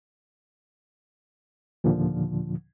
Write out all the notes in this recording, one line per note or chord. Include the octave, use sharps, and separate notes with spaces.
D#2 A#2 D3 F3